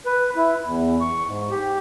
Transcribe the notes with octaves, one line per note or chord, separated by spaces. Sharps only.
B4
E4
E2
C#6
G#2
G4